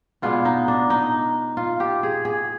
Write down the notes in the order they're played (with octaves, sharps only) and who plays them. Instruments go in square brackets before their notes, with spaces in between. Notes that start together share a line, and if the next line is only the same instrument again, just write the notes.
[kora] B2 G#3 B3 D4 F4
D#4
D4
D#4
F4
G4
G#4
G#4